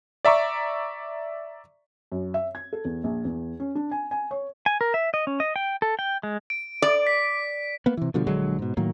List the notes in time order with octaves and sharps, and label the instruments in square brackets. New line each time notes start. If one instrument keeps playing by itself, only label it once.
[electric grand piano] D5 E5 A#5 C#6 D6
[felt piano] F#2
E5
G#6
A4
E2
A#1
E2
C#4
D4
G#5
G#5
C#5
[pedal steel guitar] G#5
A#4
E5
D#5
C#4
D#5
G5
A4
G5
G#3
[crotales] D7
[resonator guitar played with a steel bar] D5
[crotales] B6
[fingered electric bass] A#3 B3
C3 E3
B2 D3 F3 G3
A#1 D3 F#3 G#3
G#2 B2
A2 D#3 F#3 A#3